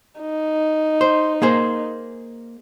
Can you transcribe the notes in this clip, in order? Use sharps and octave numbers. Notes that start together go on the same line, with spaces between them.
D#4
C5
A#3 G#4 C5